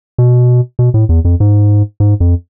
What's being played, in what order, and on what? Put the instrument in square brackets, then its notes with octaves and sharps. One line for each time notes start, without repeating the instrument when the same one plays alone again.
[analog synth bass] B2
B2
A2
E2
F2
G#2
G#2
F2